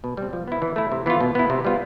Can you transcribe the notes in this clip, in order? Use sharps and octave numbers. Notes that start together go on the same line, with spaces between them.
B2
G3
C4
F3
B3 E4
E3
A3 E4
C3
E3 B3 F4
B2
B3 E4
C3
G3 B3 F4